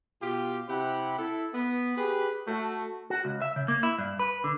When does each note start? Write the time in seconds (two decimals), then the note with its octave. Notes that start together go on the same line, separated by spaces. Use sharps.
0.22 B2 F4 G4
0.69 C3 C4 E4 G4 F#5 B5
1.19 E4 A4
1.54 B3
1.97 G4 G#4 B4
2.47 A3 F#4
3.10 F#4
3.25 C#2
3.42 E5
3.56 C#3
3.68 A#3
3.83 E4
3.99 G2
4.19 B4
4.44 D3